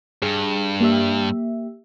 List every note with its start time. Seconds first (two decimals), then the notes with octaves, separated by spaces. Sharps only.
0.22 G2 G#4
0.81 A#3 G4 E5